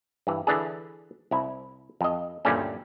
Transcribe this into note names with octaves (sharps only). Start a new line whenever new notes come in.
G2 E3
D3 E3 D4 G#4
C2 E4
F2 D#5
D2 G2 A#2 G3 A3 C#4